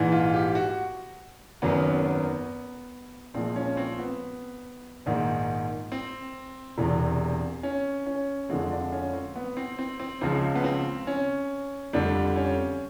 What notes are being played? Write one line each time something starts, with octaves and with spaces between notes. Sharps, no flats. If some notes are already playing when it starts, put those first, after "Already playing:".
Already playing: A#1 G#2 E3
F4
G4
F#4
G#1 F#2 D#3 F#3 B3
B3
A#1 A#2 F3 G#3 C4
C#4
C4
B3
A#1 G#2 D#3
C4
E1 E2 C3
C#4
C#4
F2 D3 F3 G#3 C4
D4
C#4
C4
B3
C4
C4
C4
C#2 C#3 F3 G#3 C4
B3
C4
C#4
F2 D3 G3 D4
C#4